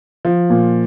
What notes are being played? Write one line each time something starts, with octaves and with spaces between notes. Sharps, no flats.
F3
A#2